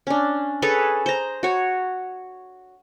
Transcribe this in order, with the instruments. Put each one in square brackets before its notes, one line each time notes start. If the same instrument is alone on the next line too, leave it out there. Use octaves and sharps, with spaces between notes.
[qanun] C#4 D4
G#4 A4 B4 C#5
C5 A#5
F#4 C#5